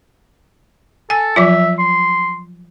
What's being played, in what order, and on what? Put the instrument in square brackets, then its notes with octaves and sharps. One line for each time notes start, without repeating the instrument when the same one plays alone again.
[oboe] A4 [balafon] G#5
[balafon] F3 F#3 F4 [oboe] E5
[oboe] C6